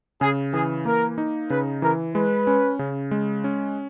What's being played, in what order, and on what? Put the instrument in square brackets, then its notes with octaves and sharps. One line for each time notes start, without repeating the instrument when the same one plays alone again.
[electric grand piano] C#3 [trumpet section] G#4
[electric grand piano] E3 [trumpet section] G#4
[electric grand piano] A#3 [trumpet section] A#4
[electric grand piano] D#4
[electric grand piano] C#3 [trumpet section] B4
[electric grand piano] E3 [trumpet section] A#4
[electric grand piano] G#3 [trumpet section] B4
[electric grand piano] C#4
C#3
G#3
C#4